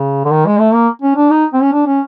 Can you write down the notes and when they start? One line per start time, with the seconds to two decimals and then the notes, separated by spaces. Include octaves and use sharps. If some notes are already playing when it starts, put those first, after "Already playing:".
Already playing: C#3
0.24 D3
0.31 D#3
0.46 G#3
0.59 A3
0.74 A#3
1.02 C#4
1.16 D4
1.30 D#4
1.53 C4
1.62 C#4
1.73 D4
1.86 C#4